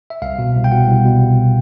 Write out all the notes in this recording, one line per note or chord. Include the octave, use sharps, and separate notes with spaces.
E5
C2 F5
B2
C2
G5
B2 F#5
C2
B2